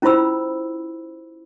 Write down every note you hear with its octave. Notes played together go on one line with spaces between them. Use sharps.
C#4 E4 F4 C5 B5 E6